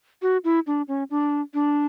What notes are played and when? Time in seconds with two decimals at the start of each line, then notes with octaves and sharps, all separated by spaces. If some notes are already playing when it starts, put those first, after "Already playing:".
0.22 F#4
0.44 E4
0.67 D4
0.88 C#4
1.10 D4
1.54 D4